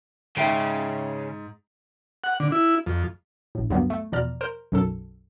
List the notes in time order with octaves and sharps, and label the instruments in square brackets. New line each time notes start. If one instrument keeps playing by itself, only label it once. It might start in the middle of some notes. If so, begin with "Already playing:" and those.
[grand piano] G#2 [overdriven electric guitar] C#3 [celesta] E5 G5 D7
[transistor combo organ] F#5
D3
E4
F2
[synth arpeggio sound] A#1 A2
D2 G2 F#3 G3 A#3 B3
A3
E2 B2 F3 D5 A#5 F6
A#4 C5
B1 F#2 F#3 A4